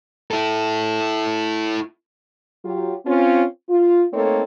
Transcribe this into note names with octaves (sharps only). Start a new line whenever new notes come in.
E4 A4
F#3 F4 G4
C4 C#4 F4
F4
A3 A#3 C4 D#4 A4 C#5